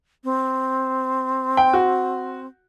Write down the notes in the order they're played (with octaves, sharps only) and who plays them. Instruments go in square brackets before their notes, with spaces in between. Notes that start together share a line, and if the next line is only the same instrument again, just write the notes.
[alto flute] C4
[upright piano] G5
F#4